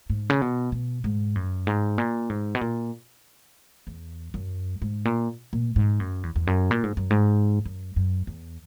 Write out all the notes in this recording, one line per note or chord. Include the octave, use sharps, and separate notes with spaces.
G#2
C#3
B2
B2
G#2
F#2
G#2
A#2
G#2
B2
A#2
E2
F#2
G#2
A#2
A#2
G#2
F#2
E2
E2
F#2
A#2
G#2
F#2
G#2
F#2
F#2
E2